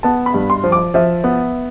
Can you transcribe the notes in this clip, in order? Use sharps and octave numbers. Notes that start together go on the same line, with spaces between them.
B3 A5
B5
G2
C6
F3
D6
F3 E5
B3